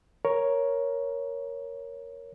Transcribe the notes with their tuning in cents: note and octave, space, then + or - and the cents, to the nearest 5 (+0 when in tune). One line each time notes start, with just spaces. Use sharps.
A#4 +10 C#5 +0